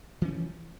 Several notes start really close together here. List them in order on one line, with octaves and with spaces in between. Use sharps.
E3 C#4 G3 F3